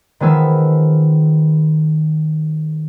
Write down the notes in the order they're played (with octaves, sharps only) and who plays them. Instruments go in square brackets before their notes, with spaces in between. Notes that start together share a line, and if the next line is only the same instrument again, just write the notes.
[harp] D#3 F3 G#3 B3 G#4 E6